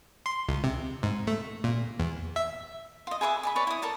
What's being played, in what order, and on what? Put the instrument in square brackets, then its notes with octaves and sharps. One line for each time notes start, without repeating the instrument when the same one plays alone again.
[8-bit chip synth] C6
C#2
C3
G#2
A3
A#2
E2
E5
[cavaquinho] F4 D#5
G#4 B4 E5 D6
D5 D#5 B5
B4 C#5 D5
E4 D#6
A4 A#4 D5